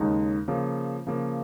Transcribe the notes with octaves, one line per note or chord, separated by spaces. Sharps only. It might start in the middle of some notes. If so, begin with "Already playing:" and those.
Already playing: D#2 C#3 G#3 D#4
C#3 F3 A#3
C#3 F3 A#3